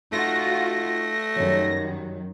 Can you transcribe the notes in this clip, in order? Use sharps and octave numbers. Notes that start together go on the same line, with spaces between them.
A3 D#4 F4 F#4 A#6
F#2 D#3 F#3 G3